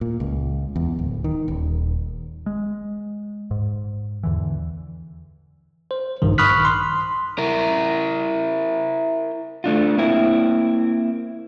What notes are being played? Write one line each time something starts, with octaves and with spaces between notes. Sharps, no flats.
A#2
C#2
E2
D1
D#3
D#1
G#3
G#2
E2 D3 E3
C5
A#1 G2 D#3
B5 C#6 D#6 F6 F#6 B6
C6
E4 A#4
A3 D4 F4
A#3 C4 E4